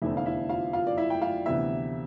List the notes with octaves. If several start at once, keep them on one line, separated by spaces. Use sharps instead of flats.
F1 E2 D3 A3 C4 E4 E5
F5
E4 E5
F4 F5
F4 F5
D5
E4 E5
G5
F4 F5
D2 C3 E3 B3 E4 E5